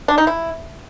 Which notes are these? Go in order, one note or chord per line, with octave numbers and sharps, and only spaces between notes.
D4
D#4
E4